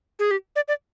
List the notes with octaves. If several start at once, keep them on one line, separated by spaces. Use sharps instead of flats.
G#4
G4
D5
D5